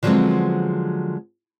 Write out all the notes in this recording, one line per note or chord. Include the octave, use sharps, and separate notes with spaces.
D3 F3 F#3 G#3 B3 C4